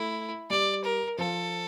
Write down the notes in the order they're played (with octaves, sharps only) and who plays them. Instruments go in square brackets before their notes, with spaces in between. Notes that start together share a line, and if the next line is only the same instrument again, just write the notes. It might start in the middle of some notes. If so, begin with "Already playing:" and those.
Already playing: [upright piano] A3 [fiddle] E4
[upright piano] G3 [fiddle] D5
[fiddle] A#4
[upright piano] F3 [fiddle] A4